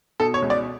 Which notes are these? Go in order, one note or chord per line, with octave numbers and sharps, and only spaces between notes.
B2 A4
C#5
C#2
D5